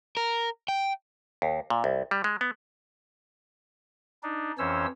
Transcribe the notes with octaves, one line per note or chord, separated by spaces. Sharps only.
A#4
G5
D#2
A#2
C2
G3
G#3
B3
D4 D#4
F2 E3 C#4 C5 C#5 E6